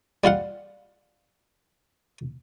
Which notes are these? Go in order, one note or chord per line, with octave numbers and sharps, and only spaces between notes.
G3 F4 F5 F#5